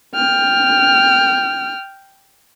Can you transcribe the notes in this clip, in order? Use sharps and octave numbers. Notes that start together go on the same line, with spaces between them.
G5 F6